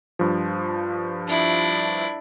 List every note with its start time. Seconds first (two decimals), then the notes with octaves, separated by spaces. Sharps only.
0.19 G2 F3
1.27 D4 E4